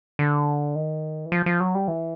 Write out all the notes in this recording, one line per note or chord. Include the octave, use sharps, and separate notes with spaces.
D3
D#3
E3
F3
F3
F#3
G3
E3